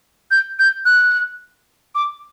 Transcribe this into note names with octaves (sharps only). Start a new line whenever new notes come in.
G6
G6
F#6
D6